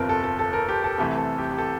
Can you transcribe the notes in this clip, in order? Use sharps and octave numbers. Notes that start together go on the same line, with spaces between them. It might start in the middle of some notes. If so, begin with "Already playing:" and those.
Already playing: G1 F2 C3 F3 A#4
A4
A4
A4
A#4
G4
A4
C2 C3 E3 A3 G4
A4
G4
G4
A4